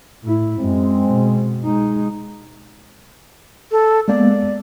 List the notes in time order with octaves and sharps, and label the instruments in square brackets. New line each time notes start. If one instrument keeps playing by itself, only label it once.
[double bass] A2 E4
[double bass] F#2 [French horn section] G#3 C4
[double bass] B2
G#3 D#4
[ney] A4
[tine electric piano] G#3 A#3 B3 [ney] D5